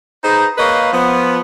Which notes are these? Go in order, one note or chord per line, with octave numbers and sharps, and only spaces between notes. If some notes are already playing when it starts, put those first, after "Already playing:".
D#4 G#4 B4 C5 A#5
A#3 B4 C#5 D#5 F5
F3 B3